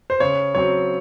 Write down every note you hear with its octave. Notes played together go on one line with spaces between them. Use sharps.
C5
C#3 C#5
F#3 C4 C#5